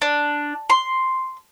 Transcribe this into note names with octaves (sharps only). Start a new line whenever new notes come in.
D4
C6